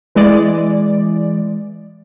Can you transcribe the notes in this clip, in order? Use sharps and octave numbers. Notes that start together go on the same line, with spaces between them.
E3 G#3 D5